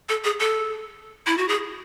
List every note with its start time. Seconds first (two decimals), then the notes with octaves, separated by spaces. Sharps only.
0.09 A4
0.24 G#4
0.40 A4
1.26 E4
1.38 F#4
1.48 G#4